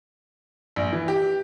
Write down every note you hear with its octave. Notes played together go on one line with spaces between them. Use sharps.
A#1
E3
G4